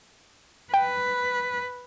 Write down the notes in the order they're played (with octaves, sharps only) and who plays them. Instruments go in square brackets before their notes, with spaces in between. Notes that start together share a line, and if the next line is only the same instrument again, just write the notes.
[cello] B4 [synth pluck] G5